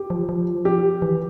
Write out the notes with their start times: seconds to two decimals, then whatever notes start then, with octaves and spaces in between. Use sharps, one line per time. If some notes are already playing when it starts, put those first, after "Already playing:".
Already playing: G4
0.10 F3
0.29 F3
0.65 G4
1.02 E3